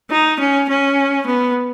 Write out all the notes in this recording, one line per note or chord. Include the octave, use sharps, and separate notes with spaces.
D#4
C#4
C#4
B3